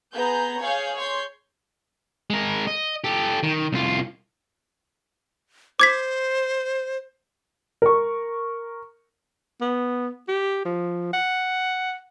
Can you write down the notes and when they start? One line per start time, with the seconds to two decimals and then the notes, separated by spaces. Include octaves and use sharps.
0.14 B3 G#4 A#5 G6
0.59 G#4 C#5 F5 G6
0.97 C#5 C6 G6
2.30 G#3 A#4
2.67 D#5
3.04 G4 A4
3.43 D#3
3.73 C2 F4
5.80 C5 D6 G#6 B6
7.82 A#4 C#6
9.61 B3
10.28 G4
10.65 F3
11.13 F#5